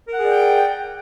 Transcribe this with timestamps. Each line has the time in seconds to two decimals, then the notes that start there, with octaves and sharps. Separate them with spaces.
0.08 A#4
0.13 F#5
0.18 G#4
0.23 D5
0.28 G5